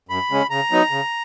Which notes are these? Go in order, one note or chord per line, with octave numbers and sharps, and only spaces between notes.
F#2 B5
C#3 G#3 C#4
C#3 A#5
F#3 B3 D#4
C#3